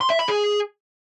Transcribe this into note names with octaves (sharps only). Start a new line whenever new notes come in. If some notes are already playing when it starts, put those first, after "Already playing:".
C6
E5
B5
G#4